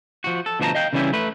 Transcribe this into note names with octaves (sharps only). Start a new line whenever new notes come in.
F3 F#4
A4
D2 B2 F3 F#4 A5 A#5
D#5 F5 G5
C#3 E3 G3 C#4 E4
A3 B4